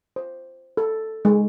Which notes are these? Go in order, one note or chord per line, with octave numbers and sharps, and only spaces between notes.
C5
A4
G#3